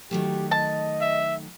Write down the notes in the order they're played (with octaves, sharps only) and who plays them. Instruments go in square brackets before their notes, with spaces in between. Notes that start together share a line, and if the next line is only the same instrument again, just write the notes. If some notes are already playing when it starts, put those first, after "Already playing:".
[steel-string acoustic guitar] D#3 F#3 A3 [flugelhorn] G4
[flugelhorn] D#5 [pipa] A5
[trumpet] E5